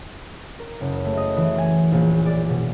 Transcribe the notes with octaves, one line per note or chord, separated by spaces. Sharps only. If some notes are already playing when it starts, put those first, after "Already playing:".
A#4
F#1
A3
D#5
E3
G#5
A#1
D5
B2